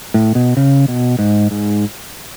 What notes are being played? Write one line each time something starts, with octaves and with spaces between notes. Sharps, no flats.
A2
B2
C#3
B2
G#2
G#2